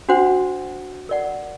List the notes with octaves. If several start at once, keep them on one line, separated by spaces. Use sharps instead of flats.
D4 F#4 C5 F#5
A#4 D5 F#5